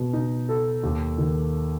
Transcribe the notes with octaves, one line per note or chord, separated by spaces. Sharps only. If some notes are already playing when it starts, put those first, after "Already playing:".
Already playing: B2
D#4
A4
D#2
D#3